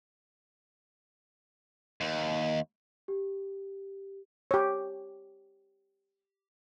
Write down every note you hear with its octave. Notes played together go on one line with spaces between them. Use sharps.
D#2
G4
G4 C#5